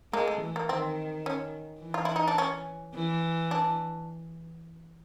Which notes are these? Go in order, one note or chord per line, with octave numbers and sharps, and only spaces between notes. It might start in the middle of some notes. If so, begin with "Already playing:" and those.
G#3 A#3
A3
E3
A#3
D#3 C4
C#4
E3
F4
E4
D#4
D4
C#4
E3
D4